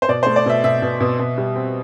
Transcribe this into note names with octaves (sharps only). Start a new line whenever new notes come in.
C5
B2 D5
A3 C5
D5
B2 E5
B2 E5
B2
B2
B2
G3
C4